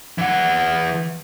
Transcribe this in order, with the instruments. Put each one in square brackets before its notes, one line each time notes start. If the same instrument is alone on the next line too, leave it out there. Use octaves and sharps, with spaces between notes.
[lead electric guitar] E3 F#5